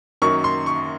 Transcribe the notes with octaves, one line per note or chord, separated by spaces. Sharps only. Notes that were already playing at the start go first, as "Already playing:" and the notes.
F#2 D#3 F#3 A#3 C#6
C6
C#6